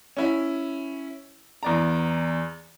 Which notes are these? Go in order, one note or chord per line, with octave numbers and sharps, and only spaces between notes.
C#4 E4
E2 D5 A#5